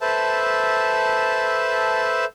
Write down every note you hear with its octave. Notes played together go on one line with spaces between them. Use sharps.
A4 B4 C5 E5 A5